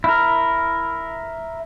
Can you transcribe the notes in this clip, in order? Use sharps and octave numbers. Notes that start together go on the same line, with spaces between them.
E4 A#4